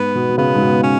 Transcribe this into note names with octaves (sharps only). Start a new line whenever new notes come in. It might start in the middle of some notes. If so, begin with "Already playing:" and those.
Already playing: G#2 B3
B2
B2
C#3 B3
G#2
B2
C#4